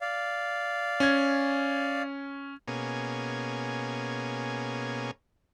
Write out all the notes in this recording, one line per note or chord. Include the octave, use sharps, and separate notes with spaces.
D5 F5
C#4 G#6
B2 A#3 C#4 G#4